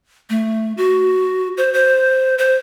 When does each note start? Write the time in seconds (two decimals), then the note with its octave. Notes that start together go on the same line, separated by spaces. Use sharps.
0.30 A3
0.77 F#4
1.57 C5
1.73 C5
2.38 C5